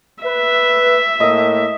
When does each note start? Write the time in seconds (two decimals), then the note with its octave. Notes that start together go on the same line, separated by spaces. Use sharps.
0.24 B4 E5
1.20 A2 A#3 D#5